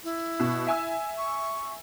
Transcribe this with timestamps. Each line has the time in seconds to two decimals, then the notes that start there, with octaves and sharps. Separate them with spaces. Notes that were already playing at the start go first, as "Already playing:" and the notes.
0.04 E4
0.40 B2
0.67 E5 G#5 E6
1.18 C#6